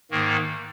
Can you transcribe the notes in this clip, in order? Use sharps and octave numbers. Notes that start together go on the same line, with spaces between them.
G#2 D#3 A#3